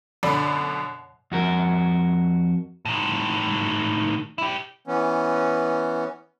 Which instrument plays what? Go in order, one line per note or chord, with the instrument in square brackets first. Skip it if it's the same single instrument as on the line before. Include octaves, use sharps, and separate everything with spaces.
[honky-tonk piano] F#2 B2 D3 D5 B5
[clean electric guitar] F2 F#4 A#4
[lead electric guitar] A2 D#3
E4 G4
[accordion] E3 B3 C#4